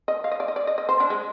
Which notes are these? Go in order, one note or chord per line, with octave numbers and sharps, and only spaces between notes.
D#5
F5
D#5
D5
D#5
D5
D#5
D#5
C5
D4
G#3